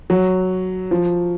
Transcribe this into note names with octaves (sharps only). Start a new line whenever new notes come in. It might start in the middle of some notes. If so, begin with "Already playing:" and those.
F#3
F3